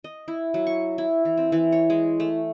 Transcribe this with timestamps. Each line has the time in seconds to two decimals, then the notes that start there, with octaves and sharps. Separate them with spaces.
0.04 D#5
0.28 E4
0.54 F#3
0.67 C#6
0.98 E4
1.25 E3
1.37 C4
1.52 E3
1.72 C#5
1.90 G#3
2.20 A3